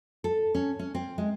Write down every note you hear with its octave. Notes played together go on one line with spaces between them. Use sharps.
A4
C#4
C#4
C4
G#3